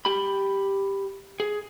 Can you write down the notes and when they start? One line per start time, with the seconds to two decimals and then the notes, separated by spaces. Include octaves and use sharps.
0.05 G4 B5
1.40 G#4